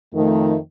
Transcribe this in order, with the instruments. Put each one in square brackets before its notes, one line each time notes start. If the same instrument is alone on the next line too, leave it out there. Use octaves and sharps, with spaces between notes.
[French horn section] F2 D#3 A3